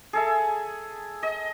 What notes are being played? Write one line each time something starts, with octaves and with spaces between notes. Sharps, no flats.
G#4 A4 E5
D#5